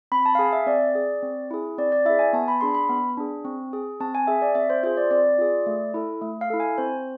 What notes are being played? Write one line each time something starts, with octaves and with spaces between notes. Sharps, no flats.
C4 B5
A5
F5
G#4 G#5
E5
C4 D5
G#4
C4
E4 G#4
C4 D5
D5
E4 G#4 E5
G#5
B3 A5
B5
D4 G#4 C6
B5
B3
D4 G#4
C4
G#4
C4 A5
G#5
G#4 E5
D5
C4 E5
C5
F4 G#4 C5
D5
C4 D5
F4 G#4
A3
E4 A4
A3
F5
E4 A4
G#5
C4 C5